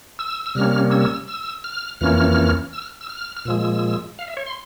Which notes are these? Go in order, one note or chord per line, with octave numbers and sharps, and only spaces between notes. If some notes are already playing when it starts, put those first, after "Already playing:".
E6
E6
C3 G3 A#3 C#4 F6
E6
E6
F6
F2 E3 A#3 C#4 F6
E6
F6
E6
F6
F6
A#2 F3 G#3 E6
F5
E5
C#5
C6